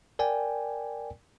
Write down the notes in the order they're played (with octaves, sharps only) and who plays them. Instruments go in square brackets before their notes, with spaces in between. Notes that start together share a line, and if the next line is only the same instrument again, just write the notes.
[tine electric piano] A#4 D5 G5 G#5